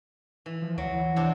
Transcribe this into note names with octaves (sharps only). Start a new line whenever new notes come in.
E3
F3
D2 F#3
E3
C3 C4 D4